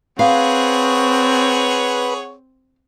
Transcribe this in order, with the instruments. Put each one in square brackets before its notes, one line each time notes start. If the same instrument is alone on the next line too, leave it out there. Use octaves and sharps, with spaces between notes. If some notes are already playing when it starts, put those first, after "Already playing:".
[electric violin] C4 [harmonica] G#4 C#5 F#5 [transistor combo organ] B4 [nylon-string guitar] F5